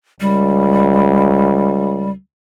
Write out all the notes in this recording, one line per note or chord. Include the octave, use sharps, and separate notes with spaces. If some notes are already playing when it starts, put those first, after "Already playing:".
C#2 G3